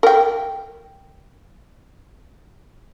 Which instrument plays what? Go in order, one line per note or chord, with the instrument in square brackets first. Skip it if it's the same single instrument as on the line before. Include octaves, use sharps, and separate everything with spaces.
[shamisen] A#4 G5